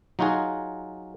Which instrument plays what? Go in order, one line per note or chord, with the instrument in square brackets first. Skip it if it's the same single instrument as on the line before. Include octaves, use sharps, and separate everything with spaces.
[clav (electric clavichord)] F#3 D#4 F4 F#4 G#4